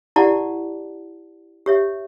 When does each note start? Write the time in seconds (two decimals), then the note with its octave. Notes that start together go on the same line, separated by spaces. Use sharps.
0.16 E4 G4 D5 F#5 A5
1.66 G4 C#5 E5